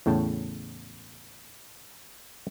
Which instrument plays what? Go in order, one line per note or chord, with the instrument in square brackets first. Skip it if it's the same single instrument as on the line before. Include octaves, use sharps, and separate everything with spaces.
[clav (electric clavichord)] E2 A2 C#3 G5 A5